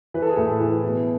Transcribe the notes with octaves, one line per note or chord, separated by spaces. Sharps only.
E3 B4
A4
G#4
A2 A4
E3
B2